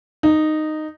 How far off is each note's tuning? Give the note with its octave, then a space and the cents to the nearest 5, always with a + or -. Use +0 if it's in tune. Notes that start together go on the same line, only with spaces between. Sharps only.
D#4 -10